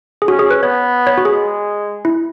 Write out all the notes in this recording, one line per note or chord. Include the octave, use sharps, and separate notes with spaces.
G#4
C#4 F#4
G#4
B4
B3 C#5
C#5
F#4
G#4
G#3
E4